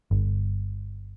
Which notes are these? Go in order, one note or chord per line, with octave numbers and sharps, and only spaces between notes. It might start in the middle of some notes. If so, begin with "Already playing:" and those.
G1